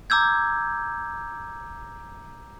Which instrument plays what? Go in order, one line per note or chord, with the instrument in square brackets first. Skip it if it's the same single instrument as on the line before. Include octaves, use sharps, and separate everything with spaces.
[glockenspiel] A#5 D6 E6 G6 G#6